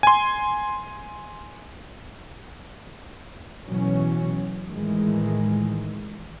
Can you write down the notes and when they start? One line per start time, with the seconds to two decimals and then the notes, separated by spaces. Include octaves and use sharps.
0.03 G#5 C6
3.66 B2 E3 F#3 C#4
4.67 A2 D#3 E3 G#3